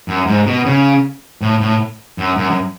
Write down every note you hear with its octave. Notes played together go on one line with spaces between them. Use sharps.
F#2
G#2
B2
C#3
A2
A2
F#2
F#2
F#2